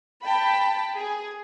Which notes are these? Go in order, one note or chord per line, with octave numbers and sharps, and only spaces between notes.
G5 A5 B5
G#4